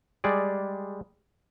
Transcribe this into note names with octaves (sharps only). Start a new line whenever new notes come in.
G3 G#3 G#4 D5